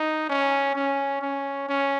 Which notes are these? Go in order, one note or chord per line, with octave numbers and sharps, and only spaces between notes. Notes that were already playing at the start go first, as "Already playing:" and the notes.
Already playing: D#4
C#4
C#4
C#4
C#4